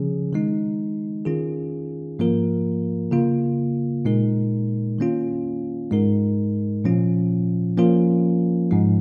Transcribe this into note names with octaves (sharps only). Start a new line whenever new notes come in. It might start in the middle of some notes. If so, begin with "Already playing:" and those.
Already playing: C#3 F3 C#4 G#4
D#3 G#3 D#4
D#3 C#4 F4 G#4
G#2 F3 A#3 F4 A#4
C#3 A#3 F4
A#2 G#3 D#4 A#4
D#3 A#3 C#4 F4
G#2 G#3 D#4 A#4
A#2 F3 C#4 F4
F3 A#3 C#4 F4 A#4
G#2 F3 G#3 D#4